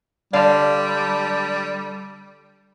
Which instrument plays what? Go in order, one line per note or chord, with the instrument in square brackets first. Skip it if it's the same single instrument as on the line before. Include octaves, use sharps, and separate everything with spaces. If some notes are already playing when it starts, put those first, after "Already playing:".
[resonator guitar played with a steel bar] D3 D5 F5 [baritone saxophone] G3